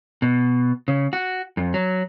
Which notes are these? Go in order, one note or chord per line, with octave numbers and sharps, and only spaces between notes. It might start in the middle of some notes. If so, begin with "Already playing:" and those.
B2
C#3
F#4
F2
F#3